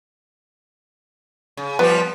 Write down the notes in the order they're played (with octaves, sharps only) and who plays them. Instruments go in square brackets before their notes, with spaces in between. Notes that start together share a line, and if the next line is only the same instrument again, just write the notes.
[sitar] C#3
[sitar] F3 G3 G4 [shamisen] B3